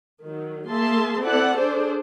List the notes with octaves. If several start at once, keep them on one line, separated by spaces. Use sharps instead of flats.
D#3 F#3
A#3 G#4 E5 A5 C6
C4 E4 A4 D5 F#5 A5
D4 G#4 A4 C5 D5